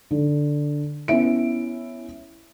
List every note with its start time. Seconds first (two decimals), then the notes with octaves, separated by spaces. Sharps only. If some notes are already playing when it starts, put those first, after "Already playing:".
0.11 D3
1.08 B3 C#4 E4 E5 D7